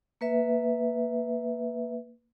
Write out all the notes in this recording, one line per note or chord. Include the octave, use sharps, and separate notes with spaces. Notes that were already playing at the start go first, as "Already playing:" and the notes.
A#3 B4 E5